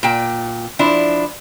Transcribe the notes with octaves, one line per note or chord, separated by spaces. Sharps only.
A#2 G5
F3 D4 E4